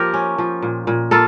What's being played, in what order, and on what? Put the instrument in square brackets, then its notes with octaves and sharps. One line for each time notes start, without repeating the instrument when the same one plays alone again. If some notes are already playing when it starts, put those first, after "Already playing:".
Already playing: [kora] F3 A#3 G4 A#4
C#4
F3
A#2
A#2
A#3 F4 A4